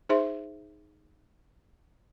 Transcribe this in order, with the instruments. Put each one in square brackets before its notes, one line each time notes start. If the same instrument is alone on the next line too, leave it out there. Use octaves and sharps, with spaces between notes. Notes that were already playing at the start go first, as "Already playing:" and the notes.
[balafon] D#4 G#4 C5 E5 C6